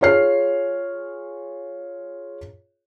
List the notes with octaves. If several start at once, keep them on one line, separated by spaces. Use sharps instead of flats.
F4 G#4 C#5 F6 C7